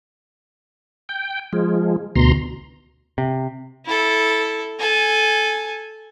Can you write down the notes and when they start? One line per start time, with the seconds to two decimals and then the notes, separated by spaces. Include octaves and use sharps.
1.09 G5
1.53 F3 G#3
2.16 D2 B2 A#5 C6
3.18 C3
3.86 E4 A4
4.80 A4 G#5